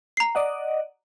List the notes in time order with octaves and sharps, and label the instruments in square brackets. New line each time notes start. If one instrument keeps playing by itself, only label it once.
[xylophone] A#5 C7
[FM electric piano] D5 D#5 F#5